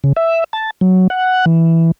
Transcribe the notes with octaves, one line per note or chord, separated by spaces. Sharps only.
C#3
E5
A5
F#3
F#5
E3